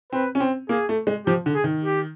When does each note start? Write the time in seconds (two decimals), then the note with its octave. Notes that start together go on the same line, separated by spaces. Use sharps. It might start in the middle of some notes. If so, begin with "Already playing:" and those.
0.12 C4 B4
0.35 C#4
0.40 C4
0.69 A#3 G#4
0.89 A3
1.07 G#3
1.26 F3 G4
1.46 D3
1.55 G#4
1.64 D#3
1.84 G4